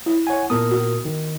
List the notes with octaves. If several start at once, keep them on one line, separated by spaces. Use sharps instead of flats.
E4
C#5 F#5 G#5
A#2 B3 A#4 D#6
F#4
D#3